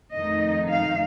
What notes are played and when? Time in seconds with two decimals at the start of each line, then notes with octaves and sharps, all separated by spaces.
0.15 F2 D#3 A3 D#4 D#5
0.69 F5